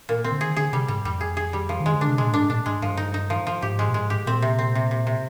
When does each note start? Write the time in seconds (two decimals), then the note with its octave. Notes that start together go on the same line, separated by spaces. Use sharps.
0.09 A#2
0.24 C4
0.32 D3
0.41 D#3 G#4
0.57 D3 G#4
0.73 C3 G3
0.88 G#2 G3
1.05 F2 G3
1.21 G#4
1.37 G#4
1.53 G3
1.69 F3
1.80 D#3
1.86 G#3
1.94 D3
2.01 D4
2.08 C3
2.18 A#2 G#3
2.33 G#2 D4
2.49 A#2 D4
2.66 G#2 G#3
2.82 G2 F3
2.97 D#4
3.14 D#4
3.30 F3
3.47 F3
3.62 G#2 G4
3.79 G#3
3.88 A#2
3.94 G#2 G#3
4.10 G4
4.26 A#2 C4
4.42 C3
4.59 C4
4.75 C3
4.91 C3
5.07 C3